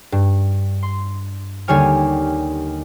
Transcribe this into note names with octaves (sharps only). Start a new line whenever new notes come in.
G2
C6
D#2 D3 G3 C#5 G#5 F6